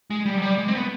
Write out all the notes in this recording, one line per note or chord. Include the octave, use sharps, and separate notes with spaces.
G#3
G3
F#3
G3
G#3
C4
B3